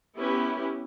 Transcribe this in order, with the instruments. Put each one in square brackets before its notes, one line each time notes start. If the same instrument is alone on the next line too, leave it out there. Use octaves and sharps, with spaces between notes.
[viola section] B3 C#4 E4 G4 B4